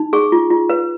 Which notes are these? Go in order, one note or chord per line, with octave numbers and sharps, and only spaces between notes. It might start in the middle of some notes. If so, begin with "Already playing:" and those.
Already playing: D#4
G#4 C#6
F4
F4
B4